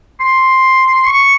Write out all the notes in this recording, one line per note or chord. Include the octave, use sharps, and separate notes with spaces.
C6
C#6